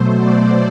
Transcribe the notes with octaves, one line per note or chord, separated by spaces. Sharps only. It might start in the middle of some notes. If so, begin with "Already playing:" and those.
Already playing: B2 F#3 A3 C5
D5